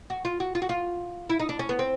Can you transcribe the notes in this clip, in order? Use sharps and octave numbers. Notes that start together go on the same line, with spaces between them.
F#4
F4
F#4
F4
F#4
F4
E4
D#4
D4
C#4
B3
C4